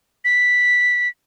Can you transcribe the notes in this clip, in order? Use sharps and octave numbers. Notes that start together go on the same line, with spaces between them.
B6